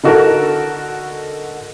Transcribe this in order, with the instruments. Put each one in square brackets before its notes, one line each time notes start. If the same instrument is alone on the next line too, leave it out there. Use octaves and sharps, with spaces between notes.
[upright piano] D3 D#4 F#4 A4 A#4